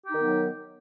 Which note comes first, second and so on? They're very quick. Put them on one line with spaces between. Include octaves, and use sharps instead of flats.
G4 D#4 D#3 B3 F#3